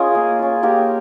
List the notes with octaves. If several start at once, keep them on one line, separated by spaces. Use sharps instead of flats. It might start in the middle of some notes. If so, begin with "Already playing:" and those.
Already playing: C#4 F4 G#4 A#4 D#5
A#3
C#4 F4
A#3 G4 A#4